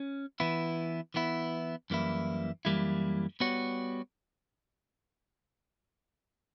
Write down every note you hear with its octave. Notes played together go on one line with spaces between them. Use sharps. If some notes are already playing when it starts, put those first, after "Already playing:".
Already playing: C#4
E3 B3 E4
E3 B3 E4
F#2 E3 G3 A#3 E4
F#2 E3 G3 A#3 E4
G3 B3 F#4 C#5